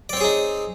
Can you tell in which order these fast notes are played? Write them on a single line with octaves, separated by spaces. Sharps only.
D5 C4 C#5 G#4 D#4